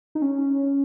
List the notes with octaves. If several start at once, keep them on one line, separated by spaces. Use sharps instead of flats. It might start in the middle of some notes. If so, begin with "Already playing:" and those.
D#4
C#4